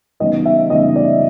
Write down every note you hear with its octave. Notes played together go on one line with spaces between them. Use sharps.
C#3 E3 G3 B3 D#4 D#5
E5
C#3 E3 G3 B3 D#4 D#5
D5